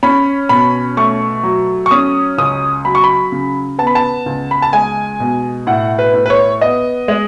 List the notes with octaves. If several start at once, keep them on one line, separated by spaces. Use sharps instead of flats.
C#4 B5
B2 B5
A3 C#6
F#3
C#6
C#4 D#6
C#2 D#6
F#3 B5
C#6
B5
C#3
B3 A5
B5
A5
C#2
B5
A5
G#3 G#5
B2
A2 F#5
B4
A2
B4
C#5
B3 D#5
G#3